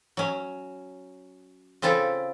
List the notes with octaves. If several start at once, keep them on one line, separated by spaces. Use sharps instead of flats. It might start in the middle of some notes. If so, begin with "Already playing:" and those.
F#3 C#4
C#3 C4 E4 F4 A4